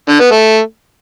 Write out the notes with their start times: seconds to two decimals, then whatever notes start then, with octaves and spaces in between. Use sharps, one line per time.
0.09 D3
0.20 B3
0.31 A3